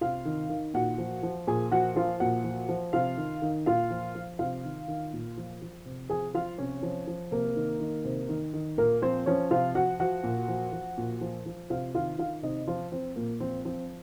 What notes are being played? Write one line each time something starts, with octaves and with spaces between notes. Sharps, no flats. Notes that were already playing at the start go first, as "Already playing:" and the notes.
C3 F4 F5
D#3
D#3
A#2 F#4 F#5
F3
F3
A#2 G#4 G#5
F3 F#4 F#5
F3 F4 F5
A#2 F#4 F#5
F3
F3
C3 F4 F5
D#3
D#3
A#2 F4 F5
F3
F3
C3 F4 F5
D#3
D#3
A#2
F3
F3
C3
F3 G#4 G#5
F3 F4 F5
C3 C#4 C#5
F3
F3
C3 A#3 A#4
D#3
D#3
C3
D#3
D#3
A#2 A#3 A#4
F3 C4 C5
F3 C#4 C#5
C3 F4 F5
F3 F#4 F#5
F3 F#4 F#5
A#2
F3
F3
A#2
F3
F3
C3 F4 F5
D#3 F4 F5
D#3 F4 F5
C3 D#4 D#5
F3 F4
F3 C4
A#2 A#3
F3 C4
F3 C4